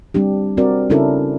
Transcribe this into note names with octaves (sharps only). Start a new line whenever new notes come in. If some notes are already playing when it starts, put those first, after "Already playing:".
G3 C4 D4 G4
C4 F#4 A#4 D5
C#3 C#4 D4 E4 A4 A#4